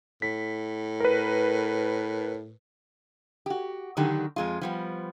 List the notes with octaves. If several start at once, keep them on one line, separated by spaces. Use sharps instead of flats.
A2 B6
A#4 B4
F#4 G4
D3 D#3 F#3 D#4 F#4 G4
F2 G#3 F4
F3 G3 B3